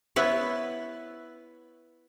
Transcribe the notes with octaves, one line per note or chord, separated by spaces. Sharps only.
B3 E4 B4 C#5